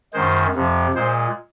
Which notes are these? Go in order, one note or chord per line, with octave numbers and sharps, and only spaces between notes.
F#2 D#3 G#3 C5
F2 C3 F3
A#2 G#3 C5